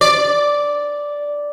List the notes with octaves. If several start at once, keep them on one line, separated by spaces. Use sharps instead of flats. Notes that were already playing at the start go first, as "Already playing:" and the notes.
D5